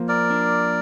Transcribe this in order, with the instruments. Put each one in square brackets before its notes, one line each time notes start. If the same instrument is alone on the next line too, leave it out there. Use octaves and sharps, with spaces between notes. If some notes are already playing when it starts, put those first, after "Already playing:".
Already playing: [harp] F3 A#3
[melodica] A#4 D5
[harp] D4